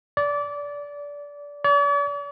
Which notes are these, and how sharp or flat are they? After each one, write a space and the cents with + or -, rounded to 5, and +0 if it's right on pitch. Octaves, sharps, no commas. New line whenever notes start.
D5 -20
D5 -45